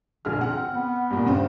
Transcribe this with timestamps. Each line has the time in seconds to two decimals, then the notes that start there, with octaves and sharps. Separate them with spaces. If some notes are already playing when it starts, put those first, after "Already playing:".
0.25 A#1 D3 G#4 F6
0.41 C4 F#5
0.75 B3
1.10 G2 A#2
1.26 G2 C#3 C4